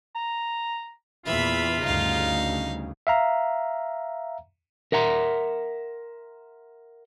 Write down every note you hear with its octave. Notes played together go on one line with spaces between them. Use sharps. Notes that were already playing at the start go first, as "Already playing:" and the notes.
A#5
E2 A#2 E3 F4 E5 B5
D2 G2 C#3 D#4 F5
E5 F5 A#5
A#4 E5 F#5 A#5 C6